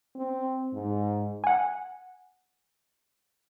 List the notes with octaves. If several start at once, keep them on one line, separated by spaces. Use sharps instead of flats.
C4
G#2
F#5 G#5